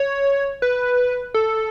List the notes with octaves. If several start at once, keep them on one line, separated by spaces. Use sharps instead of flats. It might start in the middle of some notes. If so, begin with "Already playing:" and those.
Already playing: C#5
B4
A4